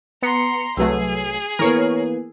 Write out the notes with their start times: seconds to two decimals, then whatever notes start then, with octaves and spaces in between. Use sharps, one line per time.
0.22 B3 A#5 C6 C#7
0.77 C2 F#3 A3 G#4 B4 E6
1.59 E3 A#3 B3 A#4 C#5